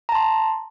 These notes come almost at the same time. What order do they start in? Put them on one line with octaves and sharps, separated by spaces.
A#5 A5 C6